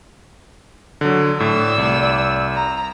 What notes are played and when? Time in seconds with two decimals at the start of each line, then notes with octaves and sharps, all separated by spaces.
1.01 D3 F#3
1.40 A2 D5 E6
1.78 C2
2.55 A#5